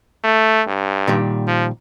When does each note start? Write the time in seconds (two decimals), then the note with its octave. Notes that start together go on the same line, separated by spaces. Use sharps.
0.24 A3
0.67 G2
1.08 A#2 D#3 G3
1.47 F3